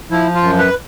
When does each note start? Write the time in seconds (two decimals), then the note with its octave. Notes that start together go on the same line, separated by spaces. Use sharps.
0.11 F3 E4
0.35 F4
0.43 F#2
0.58 B4